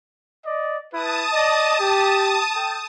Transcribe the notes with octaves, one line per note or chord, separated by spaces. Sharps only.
D5 D#5
E4 B4 A5 D#6
D5 D#5
G4
A4 G5